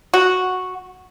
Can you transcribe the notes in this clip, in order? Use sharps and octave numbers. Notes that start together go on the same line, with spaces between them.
F#4